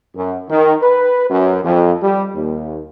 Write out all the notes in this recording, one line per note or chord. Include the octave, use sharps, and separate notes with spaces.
F#2
D#3
B4
F#2
F2
G3
D#2